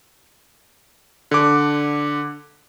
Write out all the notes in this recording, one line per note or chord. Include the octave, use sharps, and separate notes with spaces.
D3 D6